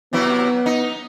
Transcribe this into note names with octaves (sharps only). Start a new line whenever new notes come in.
C3 F#3 B3 E4
D#4